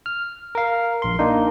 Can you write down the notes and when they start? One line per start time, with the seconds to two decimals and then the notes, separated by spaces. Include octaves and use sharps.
0.06 F6
0.55 A#4 F5
1.02 A#1 C6
1.19 A#3 D4 D#4